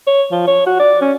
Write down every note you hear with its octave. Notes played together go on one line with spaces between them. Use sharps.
C#5
F3
C#5
F#4
D5
C#4